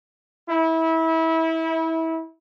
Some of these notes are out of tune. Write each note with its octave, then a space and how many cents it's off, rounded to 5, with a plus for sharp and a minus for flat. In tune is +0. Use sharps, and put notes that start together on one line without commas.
E4 -25